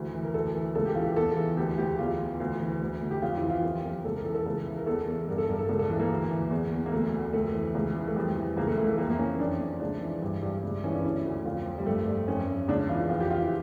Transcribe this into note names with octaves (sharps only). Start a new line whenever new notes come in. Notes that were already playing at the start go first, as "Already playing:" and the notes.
Already playing: D2 E3
E3
A#4
D2 A4
E3
C#2 A4
G4
E3 F4
G4
E2 A4
E3
D2 G4
D2 G4
E2 F4
E3
D2
E3
D2
D2
G4
F2 F4
E4
E3
F4
F2 G4
F2
C#2 A4
A#4
E3 A4
A4
C#2
E3
A#4
E2 A4
E2
G2 A#4
A4
G2 A#4
A4
C#2
A4
E3
A#3
D2
E3
E2
E2
A#3
D2 A3
D2
F2 A3
E3
C#2
E3
A3
F2 G3
E3
C#2 A#3
A3
E3 A3
A3
F2 A#3
A#3
E3 C#4
F2 D4
F2
C#2 D4
E3
G2
G2
C#2
E3 C#4
D4
D2 E4
D2
F2 F4
F2
G3
G2 A3
G2
F2 C#4
F2
C#2 D4
E3 F4
F2 F4
G4
E3 F4
E4